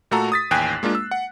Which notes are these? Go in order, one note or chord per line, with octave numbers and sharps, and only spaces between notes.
A#2 A3 F#4 A4 A#5
D#6 A6 B6
A1 D#2 G5 G#5 F#6 C7
G#3 A#3 D4 F4
E6
F#5